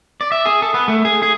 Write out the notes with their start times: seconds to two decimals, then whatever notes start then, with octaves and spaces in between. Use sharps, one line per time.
0.21 D5
0.32 E5
0.46 G#4
0.62 A4
0.74 B3
0.88 A3
1.05 G#4
1.22 G#4